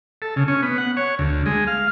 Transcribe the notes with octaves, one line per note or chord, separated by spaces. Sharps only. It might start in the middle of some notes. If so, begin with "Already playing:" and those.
A4
C#3
C#4
B3
F#5
C#5
D2
G#3
F5